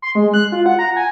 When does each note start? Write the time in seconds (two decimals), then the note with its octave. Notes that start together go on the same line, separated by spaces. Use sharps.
0.02 C6
0.15 G#3
0.34 F#6
0.52 F4
0.66 F#5
0.79 A#5
0.96 G#5